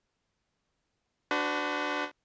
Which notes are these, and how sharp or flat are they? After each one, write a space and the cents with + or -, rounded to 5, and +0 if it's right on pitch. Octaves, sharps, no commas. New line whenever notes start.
D4 +0 F#4 +0 B4 +45